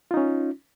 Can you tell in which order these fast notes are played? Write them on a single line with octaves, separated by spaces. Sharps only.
F4 D#4 C#4